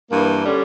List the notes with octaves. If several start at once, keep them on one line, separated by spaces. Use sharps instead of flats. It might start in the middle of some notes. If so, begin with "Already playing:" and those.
G2 E3 A#3
D3 G3 C#4